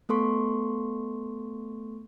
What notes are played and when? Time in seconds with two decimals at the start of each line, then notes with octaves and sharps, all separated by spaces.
0.09 A3 B3 A4 C6 C#6